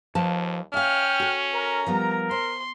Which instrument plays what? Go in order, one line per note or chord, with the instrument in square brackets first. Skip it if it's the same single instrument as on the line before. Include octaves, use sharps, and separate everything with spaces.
[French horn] D#2 [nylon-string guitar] F3 B4 A5
[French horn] C#4 [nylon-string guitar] E5 F5 [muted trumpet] G5 [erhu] F6
[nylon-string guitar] F#4 A4
[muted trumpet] A#4 [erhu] A#5
[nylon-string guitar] F3 G3 B3 [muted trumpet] A#4
[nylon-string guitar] C5 [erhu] C6